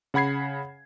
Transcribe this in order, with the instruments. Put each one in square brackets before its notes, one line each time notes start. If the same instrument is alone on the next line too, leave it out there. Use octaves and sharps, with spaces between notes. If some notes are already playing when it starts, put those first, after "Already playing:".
[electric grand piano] C#3 F#5 B5 G#6 C7